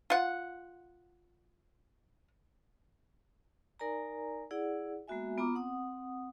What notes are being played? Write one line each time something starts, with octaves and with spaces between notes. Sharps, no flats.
F4 F#5
D#4 A#4 D5 G#5 A#5
E4 G#4 D5 F#5
G#3 A#3 B3 F#4 E5 G#5
B3 F4 A#5 D6 D#6
C4 F#5 D#6